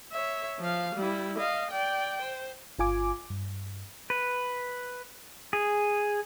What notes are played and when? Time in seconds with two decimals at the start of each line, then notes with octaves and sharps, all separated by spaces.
0.12 C#5 E5
0.59 F3 F5
0.95 G3 E4
1.38 D#5 F5
1.71 D5 G5
2.22 C5
2.79 G1 F4 G#5 D6
3.30 G2
4.10 B4
5.53 G#4